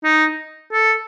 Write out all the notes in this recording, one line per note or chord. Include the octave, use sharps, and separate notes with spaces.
D#4
A4